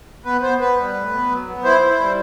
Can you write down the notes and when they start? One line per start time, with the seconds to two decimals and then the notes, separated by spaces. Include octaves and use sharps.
0.25 B3 B4
0.42 B3 C5
0.60 B3 B4
0.78 G3
0.94 A2
1.12 B3
1.29 F#3
1.47 B3
1.64 E4 C5
1.81 E4
1.99 G3